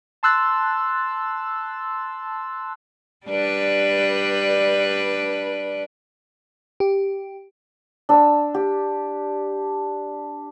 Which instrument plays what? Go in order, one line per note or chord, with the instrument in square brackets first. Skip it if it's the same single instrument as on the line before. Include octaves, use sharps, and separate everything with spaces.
[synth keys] A5 C6 E6 F#6 A6
[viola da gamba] G3 D4 B4
[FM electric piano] G4
[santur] D4 E6
G4